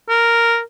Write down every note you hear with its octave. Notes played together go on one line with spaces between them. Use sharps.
A#4